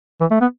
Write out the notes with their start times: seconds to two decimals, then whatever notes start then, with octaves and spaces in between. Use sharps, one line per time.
0.21 E3
0.31 A3
0.41 B3